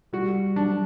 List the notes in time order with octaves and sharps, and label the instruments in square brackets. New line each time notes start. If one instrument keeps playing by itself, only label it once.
[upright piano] G3 [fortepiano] F#4
[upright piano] F#3 [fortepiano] D4